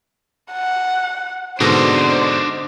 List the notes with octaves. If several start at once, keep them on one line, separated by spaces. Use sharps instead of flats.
F#5
G#2 B2 D3 D4 C5 D#5